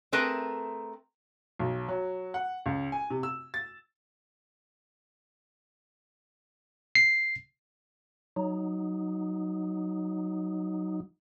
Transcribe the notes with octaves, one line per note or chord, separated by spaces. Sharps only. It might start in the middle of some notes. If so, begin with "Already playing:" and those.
A3 C4 G#4 A#4 B4 A5
B1
F#3
F#5
C#2
G#5
C3
E6
A6
C7
F#3 D#4